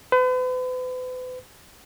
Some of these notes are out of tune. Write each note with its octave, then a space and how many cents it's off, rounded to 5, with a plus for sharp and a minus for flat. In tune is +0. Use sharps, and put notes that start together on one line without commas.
B4 +45